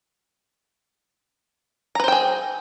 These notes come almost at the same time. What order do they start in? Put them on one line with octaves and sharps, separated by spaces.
A#5 B4 C5 G5 G#4